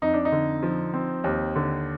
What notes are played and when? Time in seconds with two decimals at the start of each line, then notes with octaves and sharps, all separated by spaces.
0.02 F2 D#4
0.14 D4
0.25 D#4
0.32 D3
0.63 F3
0.94 C4
1.24 D#2
1.56 D3